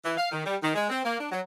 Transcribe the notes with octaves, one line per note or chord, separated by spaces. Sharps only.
E3
F5
D#3
G3
D#3
G#3
C4
A#3
D4
F#3